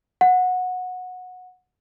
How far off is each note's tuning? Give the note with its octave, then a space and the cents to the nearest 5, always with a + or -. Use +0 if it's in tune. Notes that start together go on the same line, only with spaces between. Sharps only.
F#5 -15